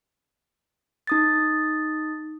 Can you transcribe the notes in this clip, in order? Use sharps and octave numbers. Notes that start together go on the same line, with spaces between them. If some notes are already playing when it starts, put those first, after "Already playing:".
D#4 D#6 A6